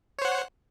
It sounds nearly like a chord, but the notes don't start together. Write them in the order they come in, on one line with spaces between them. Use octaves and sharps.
C#5 C5 F#5